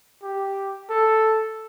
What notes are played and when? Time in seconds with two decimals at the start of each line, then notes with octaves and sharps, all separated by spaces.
0.23 G4
0.90 A4